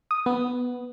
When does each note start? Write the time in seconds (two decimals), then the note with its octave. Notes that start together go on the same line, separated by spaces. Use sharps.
0.11 D#6
0.26 B3